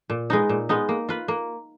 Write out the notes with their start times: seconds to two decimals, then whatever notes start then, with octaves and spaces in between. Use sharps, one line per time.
0.10 A#2
0.30 G#3 B3 D#4
0.49 A#2
0.69 G#3 B3 D#4
0.89 A#3
1.09 F4 B4
1.28 A#3